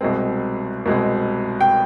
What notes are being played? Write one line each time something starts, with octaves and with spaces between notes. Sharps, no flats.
C2 B2 G#3 C4
C2 B2 G#3 C4
G5